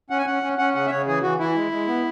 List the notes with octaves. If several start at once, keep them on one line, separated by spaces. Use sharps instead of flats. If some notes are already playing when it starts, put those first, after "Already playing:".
C#4 F#5
G#5
C#4 F#5
C#4
C#4 F#5
C#3 F#5
E5
C#3 C#5
E3 G#4
E3 F#4
E3 E4
G#3
G#3
B3